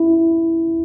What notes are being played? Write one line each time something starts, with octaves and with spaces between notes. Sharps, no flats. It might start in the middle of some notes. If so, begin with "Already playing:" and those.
Already playing: E4